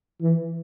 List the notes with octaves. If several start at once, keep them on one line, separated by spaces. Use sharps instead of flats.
E3